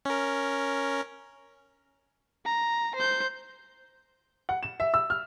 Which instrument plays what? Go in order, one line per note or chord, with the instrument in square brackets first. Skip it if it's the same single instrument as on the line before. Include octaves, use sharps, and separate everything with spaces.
[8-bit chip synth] C#4 A#4
[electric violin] A#5
C5 G6
[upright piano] F#5
E7
E5
E6
F6